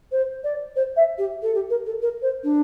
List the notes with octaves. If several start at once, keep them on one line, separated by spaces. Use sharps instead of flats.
C5
D5
C5
E5
G4
A4
G4
A#4
A4
A#4
C5
D4